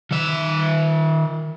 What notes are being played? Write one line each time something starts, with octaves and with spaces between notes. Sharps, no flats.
D#3 E5